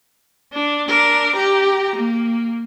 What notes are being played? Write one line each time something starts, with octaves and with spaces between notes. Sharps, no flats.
D4
D4 A#4
G4 A#5
A#3